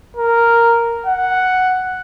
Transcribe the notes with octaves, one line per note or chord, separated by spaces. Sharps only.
A#4
F#5